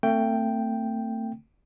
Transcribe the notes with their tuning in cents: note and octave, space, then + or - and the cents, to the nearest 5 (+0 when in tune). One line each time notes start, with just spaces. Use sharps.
A3 +35 C4 +0 G5 +0